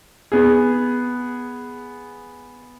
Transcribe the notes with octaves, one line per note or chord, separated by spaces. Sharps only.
B3 G#4